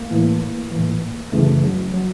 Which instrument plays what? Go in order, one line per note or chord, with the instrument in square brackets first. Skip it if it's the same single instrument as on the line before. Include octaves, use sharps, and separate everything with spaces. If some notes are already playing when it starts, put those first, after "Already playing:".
Already playing: [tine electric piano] A#3
A2 E3
A2 E3
F#2 C#3 E3 A3
F#3
F#3